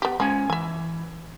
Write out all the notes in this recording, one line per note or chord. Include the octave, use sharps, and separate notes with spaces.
B3 G4
F3 G#3 C#4 G#5
E3 E5 G#5